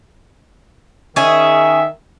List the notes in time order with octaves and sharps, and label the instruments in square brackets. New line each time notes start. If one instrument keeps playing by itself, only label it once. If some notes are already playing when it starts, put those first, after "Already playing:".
[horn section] D#3 E5 [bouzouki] C#4 G#4